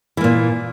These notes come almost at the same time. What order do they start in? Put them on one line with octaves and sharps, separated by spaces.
E3 A#3 A#2